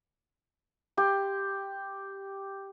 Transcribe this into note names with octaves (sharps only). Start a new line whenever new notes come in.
G4 C6